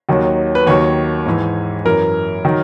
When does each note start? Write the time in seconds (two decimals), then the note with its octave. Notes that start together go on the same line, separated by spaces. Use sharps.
0.09 D#2 D#3 F#3
0.55 B4
0.66 D#2 D#3 F#3 C#5
1.26 G#2 E3
1.85 F#2 E3 A#4
2.45 D#3 F#3